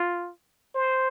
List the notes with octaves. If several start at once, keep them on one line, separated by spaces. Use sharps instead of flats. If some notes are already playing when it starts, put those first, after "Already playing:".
Already playing: F4
C5